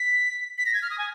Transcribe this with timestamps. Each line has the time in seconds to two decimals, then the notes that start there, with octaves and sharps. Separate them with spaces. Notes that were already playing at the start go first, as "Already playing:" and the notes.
Already playing: B6
0.58 B6
0.66 A#6
0.74 G#6
0.82 F6
0.90 D#6
0.98 G#5